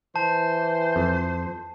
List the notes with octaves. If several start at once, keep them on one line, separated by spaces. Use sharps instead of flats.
E3 C5 A5
F2